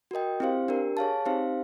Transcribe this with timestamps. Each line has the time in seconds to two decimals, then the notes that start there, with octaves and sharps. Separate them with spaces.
0.11 F#4 A#4 D#5 G5
0.40 C4 E4 G4 C5 F5
0.68 D4 G4 A#4
0.97 G#4 C#5 F5 A5
1.26 C4 D#4 G4 C5 F5